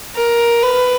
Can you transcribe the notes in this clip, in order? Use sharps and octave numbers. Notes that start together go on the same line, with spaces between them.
A#4
B4